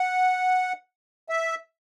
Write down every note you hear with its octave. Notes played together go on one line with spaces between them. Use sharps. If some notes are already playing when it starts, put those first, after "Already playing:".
Already playing: F#5
E5